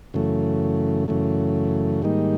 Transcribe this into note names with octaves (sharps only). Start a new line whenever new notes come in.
F#2 C#3 E3 A3
F#2 C#3 E3 A3
G#2 D#3 G3 A#3 D#4